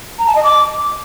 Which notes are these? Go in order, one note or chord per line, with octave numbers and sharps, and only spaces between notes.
A#5
A5
D#5
D6